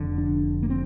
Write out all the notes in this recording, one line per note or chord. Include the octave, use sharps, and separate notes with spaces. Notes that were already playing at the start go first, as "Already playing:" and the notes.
Already playing: F1 F2 D3
D4
A#3
C4